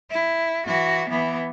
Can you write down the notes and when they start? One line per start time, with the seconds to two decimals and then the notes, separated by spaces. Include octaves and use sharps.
0.11 E4
0.66 E3 F#4
1.10 E3 B3